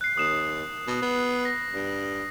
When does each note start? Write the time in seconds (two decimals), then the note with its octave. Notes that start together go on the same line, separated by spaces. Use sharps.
0.01 F#6 C7
0.17 D#2 D#6 E7
0.87 B2
1.02 B3
1.45 A#6
1.74 G2